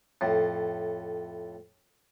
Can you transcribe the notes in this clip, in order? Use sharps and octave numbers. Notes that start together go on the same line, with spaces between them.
F2 A2